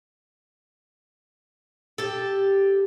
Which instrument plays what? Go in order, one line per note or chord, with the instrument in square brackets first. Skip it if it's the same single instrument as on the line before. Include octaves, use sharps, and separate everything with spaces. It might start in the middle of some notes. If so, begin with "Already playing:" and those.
[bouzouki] G4 A4